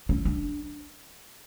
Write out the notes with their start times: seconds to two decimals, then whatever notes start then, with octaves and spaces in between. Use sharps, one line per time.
0.09 C#4
0.25 D4